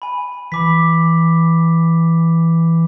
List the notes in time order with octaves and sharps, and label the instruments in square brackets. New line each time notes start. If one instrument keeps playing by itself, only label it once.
[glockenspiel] G#5 B5
[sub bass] E3 [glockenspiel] B5 D6 B6